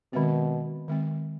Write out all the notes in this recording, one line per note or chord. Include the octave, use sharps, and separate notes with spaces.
B2 D#3 G#3 C4
D#3 G#3 C4